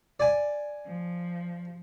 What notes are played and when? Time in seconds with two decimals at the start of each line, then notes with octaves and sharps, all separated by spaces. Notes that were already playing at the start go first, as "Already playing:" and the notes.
0.20 D5 G#5
0.86 F3